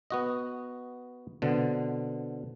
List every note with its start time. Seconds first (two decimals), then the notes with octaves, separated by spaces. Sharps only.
0.10 B3 F#4 D#5
1.42 B2 D3 C4